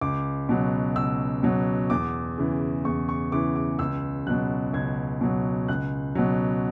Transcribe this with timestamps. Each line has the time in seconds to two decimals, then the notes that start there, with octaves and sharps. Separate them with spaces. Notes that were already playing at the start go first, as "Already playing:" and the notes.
0.01 C#2 D6
0.49 B2 F#3
0.95 C#2 E6
1.43 B2 F#3
1.90 E2 D6
2.38 C#3 E3
2.85 E2 C#6
3.09 C#6
3.32 C#3 E3 D6
3.55 D6
3.79 C#2 E6
4.27 B2 F#3 F#6
4.73 C#2 G#6
5.21 B2 F#3
5.68 C#2 F#6
6.15 B2 F#3